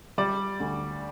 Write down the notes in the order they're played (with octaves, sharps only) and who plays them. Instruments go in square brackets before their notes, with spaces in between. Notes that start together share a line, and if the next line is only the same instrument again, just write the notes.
[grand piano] G3 D5
D2